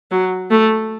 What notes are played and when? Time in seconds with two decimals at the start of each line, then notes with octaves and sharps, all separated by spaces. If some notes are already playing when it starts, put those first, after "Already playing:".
0.11 F#3
0.51 A3